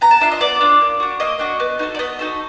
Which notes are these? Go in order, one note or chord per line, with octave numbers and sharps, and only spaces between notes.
B3 A#5
A5
D4 F4 E5
D#5
B3 D5
D4 F4
A#3
D4 F#4
A#3 D#5
D4 F#4
B3
D#4 F#4 A4
D5
B3 D#5
D#4 F#4 A4